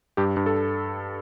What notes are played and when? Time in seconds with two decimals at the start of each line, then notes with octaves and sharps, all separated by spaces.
0.17 G2 G4
0.37 G2
0.46 A4